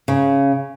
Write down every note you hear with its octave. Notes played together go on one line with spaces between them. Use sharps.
C#3